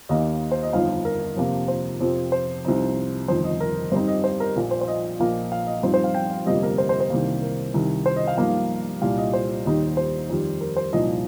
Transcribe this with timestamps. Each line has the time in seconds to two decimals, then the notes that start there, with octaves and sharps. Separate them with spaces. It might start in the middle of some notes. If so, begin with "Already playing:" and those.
0.09 D#2 D#3 A#3 D#5
0.51 C5
0.63 D#5
0.73 G1 F2 F3 D#4 F5
1.05 A#4
1.36 F2 C3 F3 A#3
1.68 C5
2.00 F2 C3 F3 C4
2.32 C5
2.65 C2 C3 F3 C4 D#4
3.28 G1 F2 D#3 C5
3.44 D#5
3.60 A#4
3.92 G2 G3 C4 D#4 C5
4.08 D#5
4.24 C5
4.40 A#4
4.56 A#1 A#2 F3
4.71 C5
4.81 C5
4.88 D#5
5.19 A#1 A#2 F3 A#3
5.52 F5
5.67 D#5
5.83 G2 F3 C4 D#4 C5
5.94 C5
6.04 F5
6.14 G5
6.31 F5
6.46 G1 F2 C3 G3 A#3 D#5
6.63 A#4
6.78 C5
6.89 C5
7.00 C5
7.10 C2 C3 D#3 G3 A#3
7.42 A#4
7.74 C2 C3 D#3
8.06 C5
8.16 D#5
8.28 F5
8.38 G2 F3 A#3 D#4 F5
9.02 C2 A#2 G3 F5
9.18 D#5
9.33 C5
9.66 D#2 D#3 G3 D#4
9.97 C5
10.29 F2 D#3 G3
10.61 A#4
10.76 C5
10.93 C2 A#2 F3 D#4 D#5